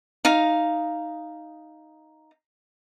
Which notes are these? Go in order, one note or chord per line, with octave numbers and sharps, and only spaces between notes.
D#4 F5